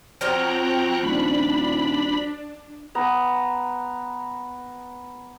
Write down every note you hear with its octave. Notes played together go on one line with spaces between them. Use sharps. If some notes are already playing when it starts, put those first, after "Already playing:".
F3 F#3 C4 F4 G5 A#5 C#6 F#6
D#1 D4 B5
B3 A#5